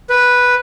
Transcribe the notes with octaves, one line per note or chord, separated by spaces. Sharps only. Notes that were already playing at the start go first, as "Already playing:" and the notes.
B4